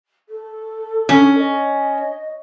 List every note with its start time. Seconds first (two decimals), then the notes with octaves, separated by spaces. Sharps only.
0.29 A4
1.09 C#4
1.37 D#5